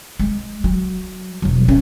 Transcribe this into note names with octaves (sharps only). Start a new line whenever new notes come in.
G#3
F#3
E1 F#3
F#3 C#4